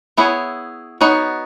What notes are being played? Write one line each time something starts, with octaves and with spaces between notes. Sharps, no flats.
B3 E4 G#4 C#5
B3 D#4 F#4 C#5